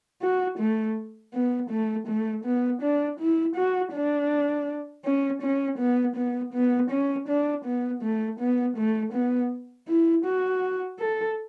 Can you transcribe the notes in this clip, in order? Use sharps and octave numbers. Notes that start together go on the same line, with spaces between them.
F#4
A3
B3
A3
A3
B3
D4
E4
F#4
D4
C#4
C#4
B3
B3
B3
C#4
D4
B3
A3
B3
A3
B3
E4
F#4
A4